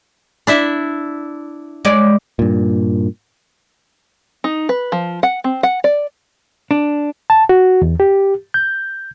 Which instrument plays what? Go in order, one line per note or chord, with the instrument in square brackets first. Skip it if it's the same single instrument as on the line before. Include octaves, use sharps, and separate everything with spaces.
[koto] D4 E4 E5
[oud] G#3 C#5 D5
[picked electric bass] G2 A#2
[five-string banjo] D#4
B4
F3
F#5
C4
F#5
D5
[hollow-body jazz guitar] D4
[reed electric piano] A5
F#4
E2
G4
G6